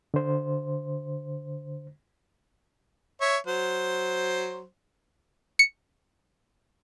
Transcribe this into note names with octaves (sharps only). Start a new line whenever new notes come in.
D3 C5
C#5 E5
F#3 C5
C#7